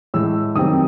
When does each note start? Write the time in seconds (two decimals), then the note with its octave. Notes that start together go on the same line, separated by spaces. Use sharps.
0.14 A2 E3 G#3 E6
0.55 F#2 D#3 G3 C4 D#6